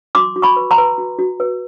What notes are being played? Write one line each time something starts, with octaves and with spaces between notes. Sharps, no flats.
F#4 C6 D6
F#4
B5 C#6
B4
A#5 C6
B4
F#4
F#4
B4